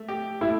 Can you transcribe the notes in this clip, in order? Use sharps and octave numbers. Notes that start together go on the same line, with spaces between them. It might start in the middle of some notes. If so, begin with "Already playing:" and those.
Already playing: A3
G4
A3 E4